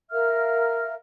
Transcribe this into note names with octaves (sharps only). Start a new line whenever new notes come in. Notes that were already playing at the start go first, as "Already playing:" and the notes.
A#4 E5 F5 F6